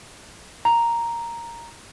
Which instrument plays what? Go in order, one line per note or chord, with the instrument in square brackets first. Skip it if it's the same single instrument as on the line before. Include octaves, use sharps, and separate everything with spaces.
[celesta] A#5